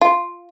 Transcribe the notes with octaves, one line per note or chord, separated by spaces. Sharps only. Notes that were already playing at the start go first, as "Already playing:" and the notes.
F4